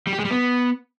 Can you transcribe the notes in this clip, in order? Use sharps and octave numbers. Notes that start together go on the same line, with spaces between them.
G3
G4
G#3
G3
B3